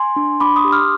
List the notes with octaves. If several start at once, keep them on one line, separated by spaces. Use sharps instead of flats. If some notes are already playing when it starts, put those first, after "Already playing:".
Already playing: G#5 C6
D4
D4 B5 D6
C6 D#6
G4
D6 F6